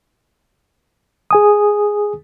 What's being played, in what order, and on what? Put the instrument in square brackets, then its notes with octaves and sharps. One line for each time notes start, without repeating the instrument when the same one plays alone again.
[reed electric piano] G#4 G#5 D#6